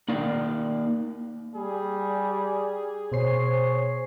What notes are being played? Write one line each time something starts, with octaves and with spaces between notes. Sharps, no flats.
A#3 D#4 D5 F5
G3 G#4
B2 C5 C#5 C7